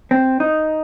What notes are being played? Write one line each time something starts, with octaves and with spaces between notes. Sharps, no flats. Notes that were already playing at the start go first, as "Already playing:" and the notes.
C4
D#4